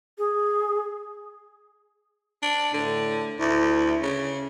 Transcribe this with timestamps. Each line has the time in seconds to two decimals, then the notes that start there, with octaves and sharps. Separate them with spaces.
0.18 G#4
2.42 D4
2.74 A2 D3
3.40 D2 E4
4.02 C#3 C#4